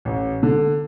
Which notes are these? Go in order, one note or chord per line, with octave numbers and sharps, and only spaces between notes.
A1
D3